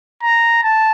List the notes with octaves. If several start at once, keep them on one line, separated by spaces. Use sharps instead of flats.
A#5
A5